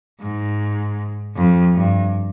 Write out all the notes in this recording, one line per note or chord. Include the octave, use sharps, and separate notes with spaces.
G#2
F2
G2